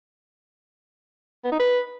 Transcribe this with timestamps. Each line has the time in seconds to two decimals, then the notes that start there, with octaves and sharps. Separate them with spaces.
1.44 B3
1.52 D#4
1.60 B4